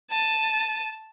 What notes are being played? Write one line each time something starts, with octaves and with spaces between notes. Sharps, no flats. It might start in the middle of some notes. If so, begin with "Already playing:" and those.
A5 D#7